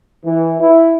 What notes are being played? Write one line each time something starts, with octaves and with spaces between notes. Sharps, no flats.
E3
E4